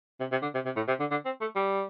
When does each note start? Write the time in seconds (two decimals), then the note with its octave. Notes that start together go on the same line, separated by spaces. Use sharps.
0.20 C3
0.32 C3
0.42 D3
0.55 C3
0.66 C3
0.76 A2
0.88 C3
1.00 D3
1.11 D3
1.25 C4
1.41 A3
1.56 G3